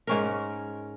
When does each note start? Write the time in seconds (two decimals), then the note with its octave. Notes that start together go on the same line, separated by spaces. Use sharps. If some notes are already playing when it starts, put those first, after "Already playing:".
0.07 G#2 C#4 A#4